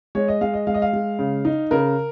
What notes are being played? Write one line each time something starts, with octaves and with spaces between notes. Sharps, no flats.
G#3 C#5
D#5
G#3 F5
D#5
G#3 F5
D#5
F5
G#3
C#3
D#4
C#3 A#4